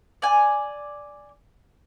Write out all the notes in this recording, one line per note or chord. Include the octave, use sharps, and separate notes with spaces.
D5 G#5